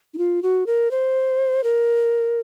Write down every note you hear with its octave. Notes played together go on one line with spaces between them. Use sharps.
D#4
F4
F#4
A#4
C5
A#4